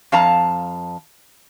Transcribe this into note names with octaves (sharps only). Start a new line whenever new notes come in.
F2 F5 A5 A#5